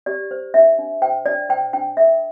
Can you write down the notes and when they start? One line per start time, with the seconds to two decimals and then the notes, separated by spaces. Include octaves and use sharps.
0.06 G4 D5
0.31 C5
0.54 D4 E5
0.79 D4
1.02 C5 G5
1.26 D4 D5
1.49 C5 G5
1.73 D4 G5
1.97 A4 E5